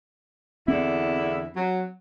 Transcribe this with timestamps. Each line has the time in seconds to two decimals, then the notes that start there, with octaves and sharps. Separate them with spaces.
0.68 E2 D3 C4 E4
1.56 F#3